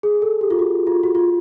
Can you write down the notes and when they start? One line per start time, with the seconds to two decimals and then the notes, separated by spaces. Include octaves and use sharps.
0.03 G#4
0.22 A4
0.41 G4
0.51 F4
0.59 F#4
0.87 F4
1.03 F#4
1.15 F4